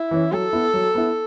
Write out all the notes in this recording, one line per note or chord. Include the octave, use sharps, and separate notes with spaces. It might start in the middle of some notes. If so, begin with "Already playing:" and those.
Already playing: E4
E3 C#4
F#3 A4
B3 E4
F#3
B3 E4